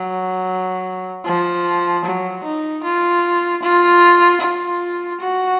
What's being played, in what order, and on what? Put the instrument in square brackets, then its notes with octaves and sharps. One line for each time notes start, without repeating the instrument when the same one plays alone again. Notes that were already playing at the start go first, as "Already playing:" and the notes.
Already playing: [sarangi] F#3
F3
F#3
D#4
F4
F4
F4
F#4